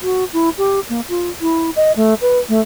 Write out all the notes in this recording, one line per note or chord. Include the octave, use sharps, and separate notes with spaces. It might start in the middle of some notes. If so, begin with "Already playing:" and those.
F#4
E4
G4
A#3
F4
E4
D#5
A3
B4
A3